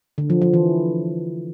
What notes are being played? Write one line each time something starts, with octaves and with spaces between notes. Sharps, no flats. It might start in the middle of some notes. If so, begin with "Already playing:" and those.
D3
F3
F3
E3